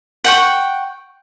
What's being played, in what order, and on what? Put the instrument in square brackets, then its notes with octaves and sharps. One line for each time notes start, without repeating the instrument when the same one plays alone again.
[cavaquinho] F#5 G5 C#6